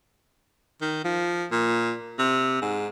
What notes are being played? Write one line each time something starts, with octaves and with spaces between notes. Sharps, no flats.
D#3
F3
A#2
C3
G#2